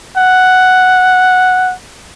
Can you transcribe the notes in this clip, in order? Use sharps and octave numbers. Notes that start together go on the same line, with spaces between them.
F#5